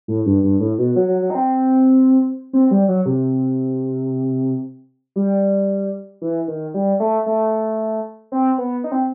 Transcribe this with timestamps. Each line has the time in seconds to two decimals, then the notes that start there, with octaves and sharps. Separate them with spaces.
0.08 A2
0.26 G2
0.43 G2
0.60 A2
0.78 B2
0.96 F#3
1.08 F#3
1.22 F#3
1.30 D#4
1.35 C4
2.53 C4
2.71 G3
2.88 F#3
3.06 C3
5.16 G3
6.22 E3
6.48 D#3
6.74 G3
7.00 A3
7.26 A3
8.32 C4
8.58 B3
8.84 D#4
8.92 C4